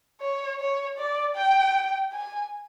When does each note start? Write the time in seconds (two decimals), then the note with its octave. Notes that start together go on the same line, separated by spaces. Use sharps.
0.21 C#5
0.60 C#5
0.98 D5
1.36 G5
2.13 G#5